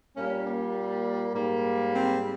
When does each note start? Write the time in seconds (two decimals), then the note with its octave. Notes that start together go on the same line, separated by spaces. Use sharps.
0.16 A#2 G3 A#3 C#4
0.46 A#3
1.34 G#2 G3 A#3
1.94 C4